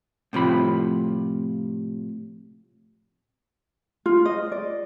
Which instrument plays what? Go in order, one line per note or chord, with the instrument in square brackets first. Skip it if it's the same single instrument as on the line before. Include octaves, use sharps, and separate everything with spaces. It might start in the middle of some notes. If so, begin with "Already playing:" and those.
[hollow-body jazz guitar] A2 C3 F3 B5
[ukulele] F4
D#5
D5